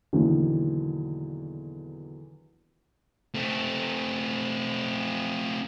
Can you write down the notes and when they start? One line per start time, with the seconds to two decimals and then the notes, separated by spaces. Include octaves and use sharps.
0.13 E2 B2 D3 D#3 F#3 A#3
3.35 A3 C4